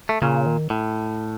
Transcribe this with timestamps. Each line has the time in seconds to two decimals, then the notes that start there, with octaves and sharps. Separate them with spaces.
0.09 A3
0.22 A#2 C#3
0.46 D#3
0.70 A2